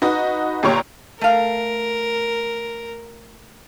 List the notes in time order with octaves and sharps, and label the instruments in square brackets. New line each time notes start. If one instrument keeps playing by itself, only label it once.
[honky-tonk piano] D#4 F#4 B4 D#5
G1 A#2 G4 C#5 A#5 C#6
[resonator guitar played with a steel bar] A3 F5 [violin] A#4